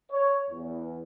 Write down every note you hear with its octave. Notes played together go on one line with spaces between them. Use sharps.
C#5
E2